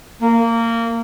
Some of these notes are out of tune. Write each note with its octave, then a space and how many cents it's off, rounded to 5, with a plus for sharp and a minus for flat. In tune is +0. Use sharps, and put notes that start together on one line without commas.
A#3 -20